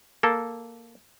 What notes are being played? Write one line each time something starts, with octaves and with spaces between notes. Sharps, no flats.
A#3 A4